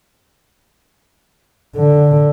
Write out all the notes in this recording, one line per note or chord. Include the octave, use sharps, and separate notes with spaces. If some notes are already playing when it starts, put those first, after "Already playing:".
D3